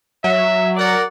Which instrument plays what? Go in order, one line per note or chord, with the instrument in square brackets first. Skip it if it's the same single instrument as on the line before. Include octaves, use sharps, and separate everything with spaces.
[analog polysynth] F#3 [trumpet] E5
[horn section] A#4 D5 F#5